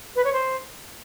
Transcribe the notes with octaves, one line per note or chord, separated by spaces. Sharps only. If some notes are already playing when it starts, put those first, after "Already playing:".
B4
C#5
C5